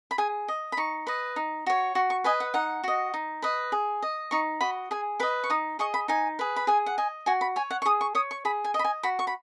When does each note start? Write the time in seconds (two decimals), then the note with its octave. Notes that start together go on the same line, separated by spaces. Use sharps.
0.11 B5
0.18 G#4 G#5
0.48 D#5
0.72 B5
0.77 D#4 C#6
1.07 B4 D#5
1.36 D#4
1.66 F#4 C#5
1.95 F#4 C#6
2.10 C#6
2.24 B4 D#5 G#5
2.40 F#5
2.54 D#4 F#5
2.84 F#4 D#5
3.14 D#4
3.42 B4 D#5
3.72 G#4
4.02 D#5
4.31 D#4 C#6
4.61 F#4 D#5 B5
4.91 G#4 G#5
5.20 B4 D#5 B5
5.44 C#6
5.50 D#4 D#6
5.79 G#4 D#5 C#6
5.94 B5
6.08 D#4 G#5
6.39 G#4 B4
6.56 B5
6.67 G#4 G#5
6.86 F#5
6.98 D#5 G#5
7.26 F#4 G#5
7.41 B5
7.56 C#5 G#5
7.71 F#5
7.82 C#6
7.85 G#4 D#6
8.01 C#6
8.15 C#5 D#6
8.31 C#6
8.45 G#4 B5
8.64 G#5
8.74 D#5
8.79 B5
8.84 G#5
9.03 F#4 B5
9.19 C#6
9.27 B5